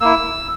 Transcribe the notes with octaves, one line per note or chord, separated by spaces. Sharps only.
A#3 E4 E6